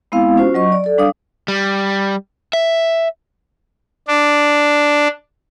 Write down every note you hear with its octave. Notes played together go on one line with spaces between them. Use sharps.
G#3 B3 C4 E4 F5
C#4 F4 F#4 C5
F#3 D#5 C#6
D5
A4 D5
G3 D4 F5 D#6
G3
E5
D4